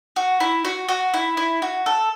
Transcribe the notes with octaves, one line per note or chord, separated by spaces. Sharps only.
F#4
E4
F#4
F#4
E4
E4
F#4
A4